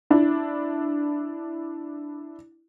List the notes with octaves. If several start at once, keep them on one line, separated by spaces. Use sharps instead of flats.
D4 E4